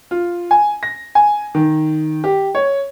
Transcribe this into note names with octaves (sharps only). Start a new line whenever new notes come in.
F4
G#5
A#6
G#5
D#3
G4
C#5